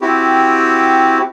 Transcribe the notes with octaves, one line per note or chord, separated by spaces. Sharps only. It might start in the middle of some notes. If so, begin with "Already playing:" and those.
C4 E4 F#4 G4